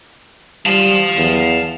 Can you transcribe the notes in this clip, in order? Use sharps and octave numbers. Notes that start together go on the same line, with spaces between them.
G3 F5 A5
E2